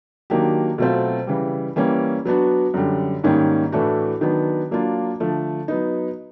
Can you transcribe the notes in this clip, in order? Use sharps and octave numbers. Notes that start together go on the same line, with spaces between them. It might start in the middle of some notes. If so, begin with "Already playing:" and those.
D#3 F#3 A#3 D4 G4
B2 F#3 A3 C4 F4
C#3 E3 G3
E3 G3 A#3 C#4
F#3 B3 D4 F#4
F#2 D3 G3
G#2 D#3 G3 A#3 C#4
A2 E3 A3 D4 F#4
D#3 F#3 B3 D4
F#3 A#3 D4 F4
D3 F3 A3
F#3 B3 D#4